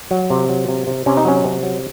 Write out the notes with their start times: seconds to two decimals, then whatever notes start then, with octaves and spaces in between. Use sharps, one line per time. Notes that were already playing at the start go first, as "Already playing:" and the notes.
0.11 F#3
0.30 C3
0.49 F#3
0.69 C3
0.87 C3
1.06 C3 C#4
1.17 D#4
1.25 F#3 C#4
1.45 C3
1.63 F#3